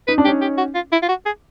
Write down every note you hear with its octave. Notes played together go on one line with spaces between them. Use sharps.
D#4 B4
D4
C#4 D#4 G4
G4
F#4
F4
E4
F4
F#4
G#4